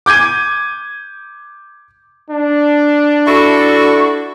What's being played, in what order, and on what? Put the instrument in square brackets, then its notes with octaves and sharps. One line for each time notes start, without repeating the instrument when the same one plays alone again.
[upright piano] D6 G6 G#6 D#7
[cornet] D4
[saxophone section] E4 F#4 A4